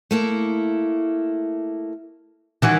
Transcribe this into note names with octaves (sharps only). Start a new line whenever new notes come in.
A3 A#3 E4
D#3 E3 C#4 F#4